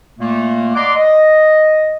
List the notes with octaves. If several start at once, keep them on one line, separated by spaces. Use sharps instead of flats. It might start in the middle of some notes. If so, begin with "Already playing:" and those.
A#2 A3 A#3
D5 D#5 F#5 A#5 C6 D6
D#5